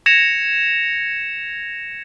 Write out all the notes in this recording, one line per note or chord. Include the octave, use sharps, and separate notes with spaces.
G#6 A#6 C#7 E7 F7